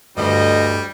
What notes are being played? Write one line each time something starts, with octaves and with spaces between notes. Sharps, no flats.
D2 G2 D3 G3 D#5